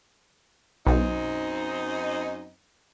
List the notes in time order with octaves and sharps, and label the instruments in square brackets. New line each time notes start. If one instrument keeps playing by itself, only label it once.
[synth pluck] B1 [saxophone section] F#2 C4 D#4